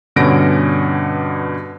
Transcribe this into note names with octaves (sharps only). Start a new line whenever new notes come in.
G2 B2 D3 C#4 A#6 D7